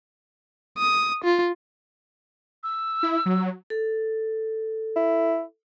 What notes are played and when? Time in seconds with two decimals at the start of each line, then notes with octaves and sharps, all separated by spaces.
0.78 D#6
1.24 F4
2.64 E6
3.03 E4
3.26 F#3
3.70 A4
4.96 E4